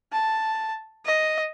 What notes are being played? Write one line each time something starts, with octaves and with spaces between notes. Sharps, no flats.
A5
D#5